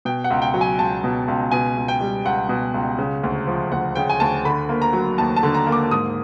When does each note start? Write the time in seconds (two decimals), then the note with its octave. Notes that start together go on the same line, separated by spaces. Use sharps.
0.05 B2 G5
0.24 F#5
0.30 C#2
0.42 G5
0.54 F#3
0.61 G#5
0.79 C#2 A5
1.04 B2
1.28 C#2
1.51 B2 G#5
1.77 C#2
1.88 G5
2.01 G3
2.25 C#2 F#5
2.49 B2
2.74 C#2
2.98 C#3
3.23 D2
3.47 F3
3.72 D2 F#5
3.95 C#3 G5
4.09 G#5
4.20 D2 A5
4.45 D3 B5
4.69 A#3
4.82 A#5
4.93 F#3
5.18 D#2 A5
5.36 A5
5.43 D3
5.54 A#5
5.67 A#3
5.72 D6
5.91 G#2 D#6